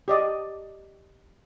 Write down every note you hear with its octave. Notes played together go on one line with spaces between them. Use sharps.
G4 D5 D#5